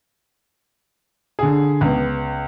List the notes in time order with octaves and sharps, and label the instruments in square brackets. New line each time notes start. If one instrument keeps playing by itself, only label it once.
[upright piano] D3 G#4
C#2 B3